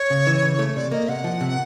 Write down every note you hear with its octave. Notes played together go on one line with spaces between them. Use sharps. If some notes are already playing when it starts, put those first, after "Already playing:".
Already playing: C#5
C#3
E3
C#3
A3
C3 D5
A#3 D#5
C3 F#5
F3
C3